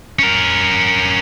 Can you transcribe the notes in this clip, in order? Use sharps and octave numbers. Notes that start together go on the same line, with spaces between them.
C#4 A#4